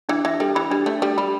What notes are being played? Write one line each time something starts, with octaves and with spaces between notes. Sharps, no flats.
E3 D4
E3 E5
G3 A4
E3 B5
G3 D4
A3 D5
G3 A4
G3 B5